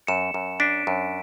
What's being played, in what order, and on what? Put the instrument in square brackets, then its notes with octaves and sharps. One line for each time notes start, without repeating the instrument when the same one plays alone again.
[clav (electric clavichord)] F#2 [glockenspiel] C#7 E7
[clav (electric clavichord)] F#2
[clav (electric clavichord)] D4 [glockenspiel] B6 D7
[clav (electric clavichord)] F#2